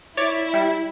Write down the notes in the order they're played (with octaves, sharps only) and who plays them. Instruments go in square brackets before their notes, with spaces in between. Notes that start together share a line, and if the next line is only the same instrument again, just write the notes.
[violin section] E4 [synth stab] C#5 D5 D6
[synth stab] G3